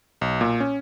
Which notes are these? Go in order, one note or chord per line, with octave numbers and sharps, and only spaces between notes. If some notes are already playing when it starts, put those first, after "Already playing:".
B1
A#2
C#4